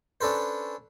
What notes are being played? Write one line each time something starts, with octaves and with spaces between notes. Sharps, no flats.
C#4 D4 A4 B4 C5